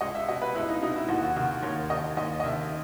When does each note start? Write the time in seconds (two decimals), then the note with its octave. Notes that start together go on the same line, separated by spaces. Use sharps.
0.01 C#2 D#5
0.15 E5
0.28 B2 D#5
0.42 B4
0.55 C#2 E4
0.69 D#4
0.82 B2 D#4
0.96 E4
1.09 D#2 F#4
1.22 F#4
1.36 D#3 F#4
1.63 D#2 C#5
1.90 D#3 D#5
2.17 D#2 D#5
2.40 D#5
2.44 D#3 E5